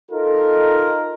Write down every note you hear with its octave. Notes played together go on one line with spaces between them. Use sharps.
D#4 F4 A4 A#4